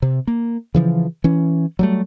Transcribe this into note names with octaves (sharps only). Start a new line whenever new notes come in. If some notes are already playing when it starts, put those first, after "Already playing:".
C3
A#3
C#3 E3 F3
E3 C#4
F#3 G3 A3